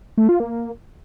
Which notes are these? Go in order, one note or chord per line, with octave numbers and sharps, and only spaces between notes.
A3
F4
A#3